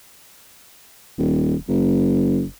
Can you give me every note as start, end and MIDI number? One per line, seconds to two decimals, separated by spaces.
1.18 1.55 27
1.68 2.43 30